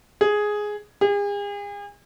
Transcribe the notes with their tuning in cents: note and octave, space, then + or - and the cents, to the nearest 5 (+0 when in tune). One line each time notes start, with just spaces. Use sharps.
G#4 +5
G#4 -40